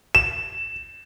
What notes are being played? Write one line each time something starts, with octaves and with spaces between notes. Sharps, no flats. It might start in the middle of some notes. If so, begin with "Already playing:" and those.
E7